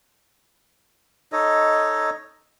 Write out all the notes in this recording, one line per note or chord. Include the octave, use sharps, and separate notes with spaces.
D#4 A4 C#5 D#5